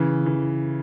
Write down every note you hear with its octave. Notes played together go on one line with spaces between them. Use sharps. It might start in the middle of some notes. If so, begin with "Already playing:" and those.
Already playing: C#3 E3
E3